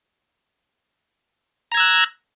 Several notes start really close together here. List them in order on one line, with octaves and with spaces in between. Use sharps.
A#5 G#6 E6 F#6